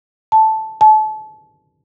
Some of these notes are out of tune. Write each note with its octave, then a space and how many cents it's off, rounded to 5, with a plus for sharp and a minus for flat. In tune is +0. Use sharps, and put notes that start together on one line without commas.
A5 -5
A5 -30